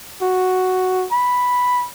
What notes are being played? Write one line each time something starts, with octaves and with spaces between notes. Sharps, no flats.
F#4
B5